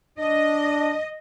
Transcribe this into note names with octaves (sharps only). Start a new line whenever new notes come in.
D4 D#5